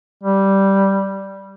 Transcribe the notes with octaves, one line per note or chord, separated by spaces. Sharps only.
G3